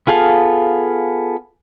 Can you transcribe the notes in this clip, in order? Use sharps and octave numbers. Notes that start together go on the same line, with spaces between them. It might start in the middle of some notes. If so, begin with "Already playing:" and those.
B3 F4 G#4 A4 F5